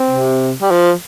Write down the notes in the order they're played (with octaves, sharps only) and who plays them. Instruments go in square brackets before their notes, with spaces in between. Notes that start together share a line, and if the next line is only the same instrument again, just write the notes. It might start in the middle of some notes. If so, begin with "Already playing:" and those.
Already playing: [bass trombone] C4
[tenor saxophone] C3
G3
F3